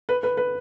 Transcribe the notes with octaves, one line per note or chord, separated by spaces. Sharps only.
B4
B4
B4